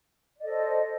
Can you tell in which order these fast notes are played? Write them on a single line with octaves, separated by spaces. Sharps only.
D5 D#5 A4 C5